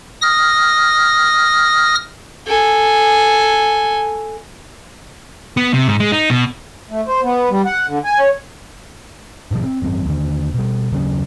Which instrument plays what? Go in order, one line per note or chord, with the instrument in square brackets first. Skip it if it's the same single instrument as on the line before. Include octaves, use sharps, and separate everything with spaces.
[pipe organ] D#6 F6 A#6
[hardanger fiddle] A4 G#5
[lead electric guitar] B3
C3
G#2
G#3
D#4
B2
[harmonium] A3
C5
B3
G3
F#5
D3
G#5
C#5
[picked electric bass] G#2 B2 D3 F3
C4
G#1 F#2 C4
D#2 D3
B2 G3
D#2 C#3 F#3 C#4